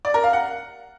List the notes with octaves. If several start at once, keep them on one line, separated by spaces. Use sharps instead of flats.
D5
A#4
F5
F#5